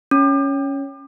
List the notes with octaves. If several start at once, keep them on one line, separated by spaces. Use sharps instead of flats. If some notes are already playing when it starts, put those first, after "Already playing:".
C#4